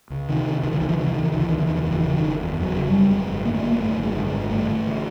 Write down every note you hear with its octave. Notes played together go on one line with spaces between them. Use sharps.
C#2
C3 D#3
C3
C#2 D#3
E3
C#2 D#3
E3
C3 D#3
E3
C3 D#3
E3
C#2 D#3
E3
C#2 D#3
E3
D#3
E2
E3
D#3
F#1 E3
D#3
C#3 E3
D#3
F#1
E2
F#1 F#3
C#3
G3
F#1
F#2 G#3
G#1
D3 A#3
A3
G#1 A#3
F#2 A3
G#1
G#3
D3
G#3
G#1
G2 A3
A1
D3